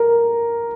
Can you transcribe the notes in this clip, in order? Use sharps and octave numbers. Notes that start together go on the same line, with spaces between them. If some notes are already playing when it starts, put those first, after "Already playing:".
Already playing: A#4